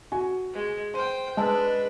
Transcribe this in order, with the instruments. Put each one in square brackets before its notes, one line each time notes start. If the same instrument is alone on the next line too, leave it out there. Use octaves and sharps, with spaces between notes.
[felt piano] F#4 G#5
[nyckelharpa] G#3
[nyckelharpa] C5 G5 [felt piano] C6 D#7
[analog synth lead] G#3 [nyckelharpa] D4 B4 [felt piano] G#5 A5 E6